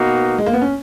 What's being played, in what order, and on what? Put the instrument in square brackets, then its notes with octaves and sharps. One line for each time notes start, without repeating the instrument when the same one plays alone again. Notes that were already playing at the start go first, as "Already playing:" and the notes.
Already playing: [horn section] B2 A#3 D#4 F#4 [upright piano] B3
[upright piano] G#3
A#3
B3
C#4